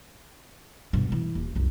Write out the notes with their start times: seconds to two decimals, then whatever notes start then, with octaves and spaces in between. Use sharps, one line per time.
0.93 G2 B2
1.12 E3
1.35 D#1
1.55 C2 F#2